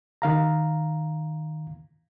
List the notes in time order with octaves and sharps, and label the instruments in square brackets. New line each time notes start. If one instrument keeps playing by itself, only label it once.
[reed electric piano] D#3 F5 A#5